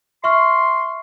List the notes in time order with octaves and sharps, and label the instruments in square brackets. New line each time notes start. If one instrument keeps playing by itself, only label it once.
[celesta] E5 C#6 F6 [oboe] C6